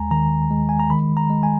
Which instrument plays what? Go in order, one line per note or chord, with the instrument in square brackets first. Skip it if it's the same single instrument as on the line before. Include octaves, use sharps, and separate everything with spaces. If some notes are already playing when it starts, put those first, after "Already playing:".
Already playing: [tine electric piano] D#2 G#3 G#5 A#5
D#3 A#5
G#3
G#5
A#5
D#3 B5
A#5
G#3
G#5